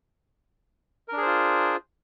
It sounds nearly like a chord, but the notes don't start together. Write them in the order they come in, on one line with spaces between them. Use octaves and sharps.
A#4 D4 G#4 C5 F4